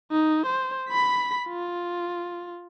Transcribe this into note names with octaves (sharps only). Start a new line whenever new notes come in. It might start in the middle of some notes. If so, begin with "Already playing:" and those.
D#4
C5
B5 B6
F4